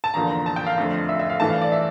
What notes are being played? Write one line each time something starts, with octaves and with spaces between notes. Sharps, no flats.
A5
E2 D3 F3 A#3 A#5
A#5
A5
G5
F5
F2 D3 F3 A3
E5
E5
F5
G2 E3 A3 A5
F5
D5
E5